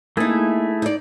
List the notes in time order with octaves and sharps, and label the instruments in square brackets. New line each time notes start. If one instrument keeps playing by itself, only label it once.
[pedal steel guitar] A3 E4 G#4 [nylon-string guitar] A#3 D#4
[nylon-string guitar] D#4 D5